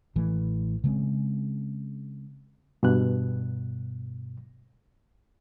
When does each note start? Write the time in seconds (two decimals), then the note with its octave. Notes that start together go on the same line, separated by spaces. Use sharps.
0.16 A1 E3 A3
0.84 C#3 G#3 C4
2.83 G2 B2 F#6